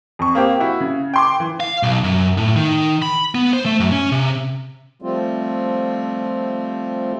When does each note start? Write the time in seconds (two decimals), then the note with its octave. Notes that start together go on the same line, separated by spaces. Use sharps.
0.19 F2 C#6
0.35 A#3 C4 G4
0.60 E4 F#4
0.80 C#3
1.14 G5 C6 D6
1.40 E3
1.60 F5
1.83 B1
2.04 F#2
2.37 A2
2.56 D#3
3.02 B5
3.35 B3
3.53 C5
3.66 A3
3.80 F#2
3.92 C#4
4.12 C3
5.02 F3 G3 A3 C4 F4